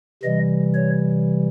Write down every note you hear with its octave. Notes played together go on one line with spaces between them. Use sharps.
C3 E3 G3 D#5
C#5